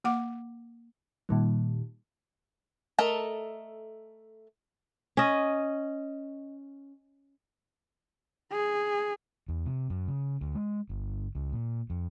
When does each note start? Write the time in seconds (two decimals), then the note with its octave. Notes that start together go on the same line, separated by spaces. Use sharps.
0.04 A#3 F#5 D6
1.29 A#2 D#3 G3
2.98 A3 A4 A#4 D#5
5.17 C#4 D#5
8.52 G#4
9.48 E2
9.66 C3
9.90 F#2
10.08 C#3
10.41 D2
10.55 G#3
10.89 G1
11.35 C#2
11.53 A#2
11.90 F2